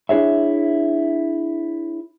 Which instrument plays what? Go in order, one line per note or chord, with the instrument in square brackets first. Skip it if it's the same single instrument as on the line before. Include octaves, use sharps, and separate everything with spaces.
[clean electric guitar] D4 E4 G#4 C#5 E5